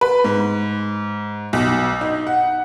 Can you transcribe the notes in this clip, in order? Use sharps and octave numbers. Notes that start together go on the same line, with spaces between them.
B4
G#2
B1
D#4
F#5